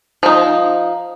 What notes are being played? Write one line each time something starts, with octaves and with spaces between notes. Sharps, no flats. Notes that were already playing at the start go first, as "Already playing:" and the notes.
F3 D#4